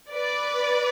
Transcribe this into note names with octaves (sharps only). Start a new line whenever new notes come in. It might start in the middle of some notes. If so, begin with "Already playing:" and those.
B4 D5